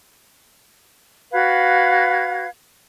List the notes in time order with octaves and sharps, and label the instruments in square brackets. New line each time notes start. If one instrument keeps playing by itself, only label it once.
[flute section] F#4 B4 F5 G#6